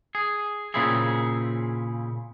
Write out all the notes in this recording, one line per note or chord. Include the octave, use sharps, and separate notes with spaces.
G#4
A#2 C#3 C4 E4 G#4